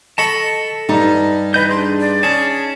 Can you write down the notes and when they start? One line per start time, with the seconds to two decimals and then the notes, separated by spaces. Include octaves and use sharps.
0.18 A4 D#5 A5 B5 C#6
0.89 G2 D#4
1.54 E3 B4 D#5 G6
1.69 D4 G#4 C6
2.00 D5
2.23 C#4 G#4 A5